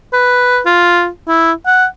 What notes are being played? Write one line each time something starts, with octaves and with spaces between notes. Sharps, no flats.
B4
F4
E4
F#5